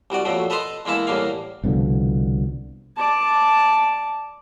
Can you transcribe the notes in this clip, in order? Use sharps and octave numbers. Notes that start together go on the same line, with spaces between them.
C2 G3 F#4 D5
F2 A#2 F#3 A3
A4 B4 D#5 A#5 C6
E2 G#3 A#3 E4 A5
E2 A2 G3 A#3 F5
C2 B2 D3 F3
D5 A5